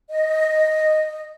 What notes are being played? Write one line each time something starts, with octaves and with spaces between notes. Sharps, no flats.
D#5